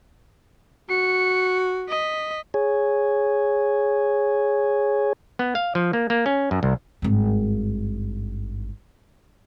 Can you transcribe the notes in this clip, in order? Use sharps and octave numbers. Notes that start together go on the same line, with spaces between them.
F#4 C#7
D#5 B6
G#4 C#5
B3
F5
F3
A#3
A#3
C#4
F#2
C2
G#1 G2